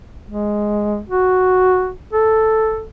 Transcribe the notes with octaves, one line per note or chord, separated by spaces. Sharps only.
G#3
F#4
A4